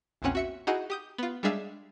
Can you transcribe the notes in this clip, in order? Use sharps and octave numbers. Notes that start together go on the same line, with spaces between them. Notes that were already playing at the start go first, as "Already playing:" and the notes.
A#1 E2 A#2 C4 C#4 F#5
F#4 E5 C#7
D#4 E4 F#4 G#4 D#5 F#5
G4 D#6 G6
B3 F4
G3 G#3 D4 G#4 E5 F5